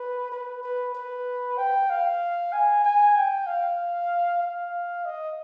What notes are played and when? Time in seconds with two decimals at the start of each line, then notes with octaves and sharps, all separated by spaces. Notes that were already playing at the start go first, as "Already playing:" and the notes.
Already playing: B4
0.32 B4
0.63 B4
0.95 B4
1.58 G5
1.90 F5
2.53 G#5
2.84 G#5
3.16 G5
3.47 F5
4.42 F5
5.05 D#5